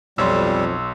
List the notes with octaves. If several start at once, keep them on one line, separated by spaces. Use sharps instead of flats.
B1 F2 G3 C#5 C6 E6